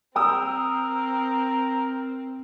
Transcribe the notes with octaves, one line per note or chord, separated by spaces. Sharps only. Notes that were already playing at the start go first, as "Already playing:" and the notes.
C4 A#4 G5 D#6 E6